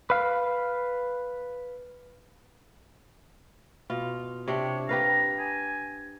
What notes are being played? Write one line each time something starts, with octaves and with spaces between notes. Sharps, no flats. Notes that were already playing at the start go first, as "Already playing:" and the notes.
B4 F5
B2 F4
C3 D4 G4 C#5
G4 B4 F5 A#5
G#5